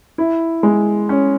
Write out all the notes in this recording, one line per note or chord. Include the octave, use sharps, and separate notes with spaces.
E4
G#3
C#4